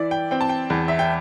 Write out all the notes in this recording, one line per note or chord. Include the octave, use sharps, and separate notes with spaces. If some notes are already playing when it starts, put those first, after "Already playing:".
Already playing: E3 E4 D5
G5
C4 G5
A5
G5
E2
E5
G5